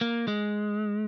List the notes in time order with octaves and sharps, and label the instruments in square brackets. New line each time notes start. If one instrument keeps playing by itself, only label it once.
[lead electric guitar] A#3
G#3